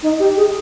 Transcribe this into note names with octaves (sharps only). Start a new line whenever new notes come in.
D#4
G4
G#4